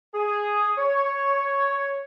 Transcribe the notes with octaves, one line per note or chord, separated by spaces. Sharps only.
G#4
C#5